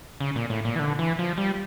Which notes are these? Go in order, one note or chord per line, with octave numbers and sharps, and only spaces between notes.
C#3
A#2
A2
A#2
E3
D3
E3
F3
G3